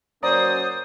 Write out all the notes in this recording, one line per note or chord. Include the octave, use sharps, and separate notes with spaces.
F#3 A#3 C#4 C5 D5 A#5 D#6